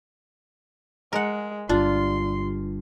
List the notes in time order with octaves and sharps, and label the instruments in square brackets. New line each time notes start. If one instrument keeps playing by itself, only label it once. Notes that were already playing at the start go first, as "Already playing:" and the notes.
[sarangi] G#3 [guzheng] A#4 F#5
[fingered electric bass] G1 G2 [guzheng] D4 [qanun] F4 [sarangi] C6